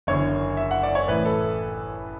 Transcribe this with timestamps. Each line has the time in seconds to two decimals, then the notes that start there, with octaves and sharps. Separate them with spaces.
0.07 F#1 E2 D3 C#5
0.57 E5
0.71 F#5
0.83 D5
0.95 C#5
1.08 A1 A2 E3 B4
1.25 A4